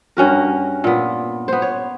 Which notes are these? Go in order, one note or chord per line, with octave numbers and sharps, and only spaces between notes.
G2 C#4 F#4 A#4
A#2 B3
B3 C5
C#5